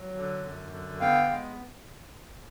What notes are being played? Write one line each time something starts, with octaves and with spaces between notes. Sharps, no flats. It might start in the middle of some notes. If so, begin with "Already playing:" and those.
Already playing: F#3
D3
F#2
D3
B3 F5 G5
G#3